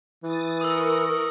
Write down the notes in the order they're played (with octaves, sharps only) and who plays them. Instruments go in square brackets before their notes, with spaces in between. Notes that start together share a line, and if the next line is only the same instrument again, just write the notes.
[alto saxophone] E3 [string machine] D#6 A6
[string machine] A#4 A#5 C#6 [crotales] D#6 E6